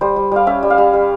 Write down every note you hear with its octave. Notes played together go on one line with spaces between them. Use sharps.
G3 C5
G3
G3 F5
C#4 E5
G3
F5
G3
G3